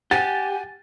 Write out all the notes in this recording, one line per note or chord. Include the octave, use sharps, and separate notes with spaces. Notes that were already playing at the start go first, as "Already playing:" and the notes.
G4 F#5 G#5 A6